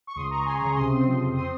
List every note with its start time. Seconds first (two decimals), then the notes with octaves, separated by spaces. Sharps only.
0.07 C#6
0.16 C#2 C6 D#6
0.31 C#2 A#5 C#6
0.46 C#2 G#5 C6
0.61 C#3 A#5 C#6
0.76 C3 C6 D#6
0.92 C4
1.07 F3
1.21 F2
1.36 C4 C6 D#6